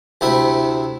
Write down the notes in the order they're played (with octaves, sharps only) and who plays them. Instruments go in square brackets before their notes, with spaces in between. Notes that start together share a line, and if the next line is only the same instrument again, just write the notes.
[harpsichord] D2 C3 E4